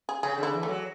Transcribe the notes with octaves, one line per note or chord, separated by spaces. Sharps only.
G#4
C#3 G#4
D3 E4
E3
A3
F#3